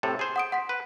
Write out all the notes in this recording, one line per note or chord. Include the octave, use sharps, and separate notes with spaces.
A2 C3 A4
G#4 C5
F#5 D#6 D7
F#5 C6 B6
B4